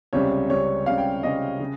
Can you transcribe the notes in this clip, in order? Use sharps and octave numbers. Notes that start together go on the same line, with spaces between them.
C#2 C3 G3 C#4 C#5
C#2 C3 G3 C#4 C#5
C#2 C3 G3 C#4 F5
G5
C#2 C3 G3 C#4 D#5
C#3